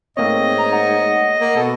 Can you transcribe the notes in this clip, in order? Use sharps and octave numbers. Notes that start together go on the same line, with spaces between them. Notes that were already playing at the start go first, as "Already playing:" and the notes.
G#2 A3 A#3 C4 C#5 D#5
A#5
F#5
A#3
B2 A4